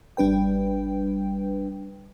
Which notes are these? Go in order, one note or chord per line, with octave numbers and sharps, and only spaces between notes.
G#1 G3 D4 B4 G5